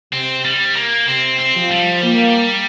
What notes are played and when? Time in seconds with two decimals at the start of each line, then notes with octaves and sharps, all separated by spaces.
0.13 C3 C4
0.45 G3
0.76 A#3
1.08 C3 C4
1.39 C4
1.55 F3
1.71 G3
2.02 A#3